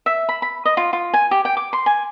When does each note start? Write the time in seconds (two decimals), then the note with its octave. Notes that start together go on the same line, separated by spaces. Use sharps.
0.06 E5
0.29 B5
0.42 B5
0.65 D#5
0.77 F4
0.93 F4
1.13 G#5
1.31 G4
1.45 G5
1.57 D6
1.73 C6
1.86 G#5